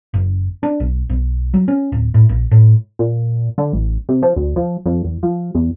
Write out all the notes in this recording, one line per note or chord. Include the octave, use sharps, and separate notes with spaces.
F#1
D4
B1
B1
F#3
C#4
D1
A2
A#1
A2
A#2
D3
A1
C3
F3
D2
F3
F2
E2
F3
E2